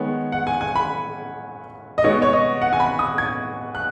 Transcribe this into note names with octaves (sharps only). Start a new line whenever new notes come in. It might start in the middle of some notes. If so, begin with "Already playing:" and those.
Already playing: D#3 G#3 B3 C#5
F#5
G#5
G#5
B5
D#5
B2 G#3 B3 C#5
C#5
D#5
F#5
G#5
B5
D#6
G#6
F#6